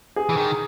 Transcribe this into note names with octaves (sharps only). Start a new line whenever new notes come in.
G#4
E3
D#3